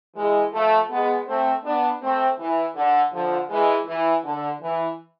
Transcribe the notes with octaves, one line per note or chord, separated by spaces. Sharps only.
E3 G#3
F3 A3
G#3 B3
A3 C4
B3 D4
A3 C4
E3
D3
D3 F3
E3 G#3
E3
D3
E3